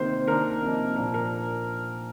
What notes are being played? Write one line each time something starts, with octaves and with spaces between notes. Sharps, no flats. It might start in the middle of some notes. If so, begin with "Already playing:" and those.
Already playing: C3 D#3 A#3 C5
D#3 A#3 D4 A#4
C3 F3 A#3 D#4
A#2 F3 A#3 D4 A#4
A#4